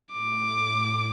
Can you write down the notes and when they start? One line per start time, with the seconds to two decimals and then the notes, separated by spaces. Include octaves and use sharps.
0.13 A2 D6